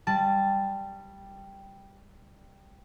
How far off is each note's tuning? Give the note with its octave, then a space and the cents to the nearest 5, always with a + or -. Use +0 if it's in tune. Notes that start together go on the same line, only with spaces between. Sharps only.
G3 +0 A5 +0